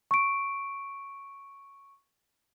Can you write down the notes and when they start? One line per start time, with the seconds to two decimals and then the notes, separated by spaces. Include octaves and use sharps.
0.11 C#6 D7